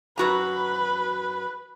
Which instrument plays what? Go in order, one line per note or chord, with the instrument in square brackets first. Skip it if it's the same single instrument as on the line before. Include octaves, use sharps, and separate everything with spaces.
[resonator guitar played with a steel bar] F#2 F#4 A#5 [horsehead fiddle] B4